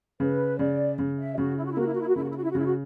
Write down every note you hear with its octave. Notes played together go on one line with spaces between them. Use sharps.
C#3 B4
C#3 D5
C#3
E5
C#3 F#4
E4
F#4
E4
A#3 F#4
E4
F#4
E4
F#4
C#3 E4
F#4
E4
F#4
E4
F#4
C#3 E4
F#4